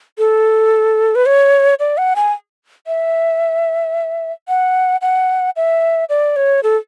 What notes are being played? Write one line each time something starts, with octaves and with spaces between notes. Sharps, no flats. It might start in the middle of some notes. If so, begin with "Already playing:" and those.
A4
B4
C#5
D5
F#5
G#5
E5
F#5
F#5
E5
D5
C#5
A4